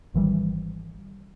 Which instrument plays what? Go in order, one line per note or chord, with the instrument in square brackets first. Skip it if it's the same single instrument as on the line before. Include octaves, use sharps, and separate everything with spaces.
[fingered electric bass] G#1 D#3 E3 G3